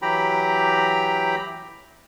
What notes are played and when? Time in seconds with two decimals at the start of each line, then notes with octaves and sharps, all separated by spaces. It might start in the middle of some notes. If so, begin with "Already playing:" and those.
0.02 E3 F#3 G4 G5 A#5 B5